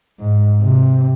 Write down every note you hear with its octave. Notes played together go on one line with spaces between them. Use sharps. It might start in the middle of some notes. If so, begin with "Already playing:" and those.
G#2
C3